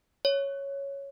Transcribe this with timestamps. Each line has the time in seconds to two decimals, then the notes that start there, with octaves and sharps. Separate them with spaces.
0.25 C#5